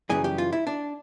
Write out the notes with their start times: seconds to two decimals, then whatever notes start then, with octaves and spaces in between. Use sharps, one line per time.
0.10 F#2 C#3 E3 G3 G#4
0.24 G4
0.38 F4
0.53 E4
0.67 D4